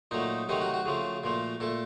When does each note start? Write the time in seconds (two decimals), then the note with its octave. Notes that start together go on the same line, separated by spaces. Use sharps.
0.11 A#2 F#3 A3 D#4
0.49 C3 D#3 F#3 A3 D#4
0.61 F#4
0.74 F#4
0.85 C#3 F3 A3
1.24 A#2 F3 A3
1.60 A#2 A3 A4